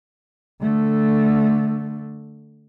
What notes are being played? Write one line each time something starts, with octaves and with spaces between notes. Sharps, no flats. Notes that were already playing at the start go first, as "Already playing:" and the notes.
D3 A3